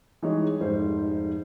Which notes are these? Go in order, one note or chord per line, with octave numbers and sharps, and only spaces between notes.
E3 G3 G#3 D#4 G4 C#5
F1 G#2 C5